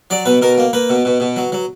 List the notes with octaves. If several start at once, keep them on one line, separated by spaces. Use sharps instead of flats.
F#3 D5
B2 B4
B2 A#4
A#3
A#3 B4
B2
B2
B2
F#3
F#3